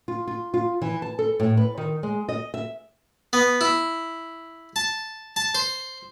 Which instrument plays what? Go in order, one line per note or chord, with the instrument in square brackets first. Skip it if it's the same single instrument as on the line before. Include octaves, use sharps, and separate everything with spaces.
[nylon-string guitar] F4
F4
F4
E3
A5
A4
A2
B4
D#3
G#3
D#5
E5
[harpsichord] B3
E4
A5
A5
C5